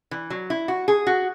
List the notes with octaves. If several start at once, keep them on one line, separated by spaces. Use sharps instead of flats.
E3
F#3
E4
F#4
G#4
F#4